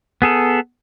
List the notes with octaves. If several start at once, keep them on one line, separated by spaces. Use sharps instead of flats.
B3 G#4 A4